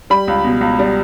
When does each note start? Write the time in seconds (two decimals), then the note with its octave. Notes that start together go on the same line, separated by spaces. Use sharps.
0.10 G3 B5
0.28 C#2
0.44 B2
0.61 C#2
0.79 G3